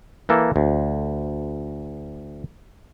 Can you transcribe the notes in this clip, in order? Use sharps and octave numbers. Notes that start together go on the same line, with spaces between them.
E3 A#3 A4
D2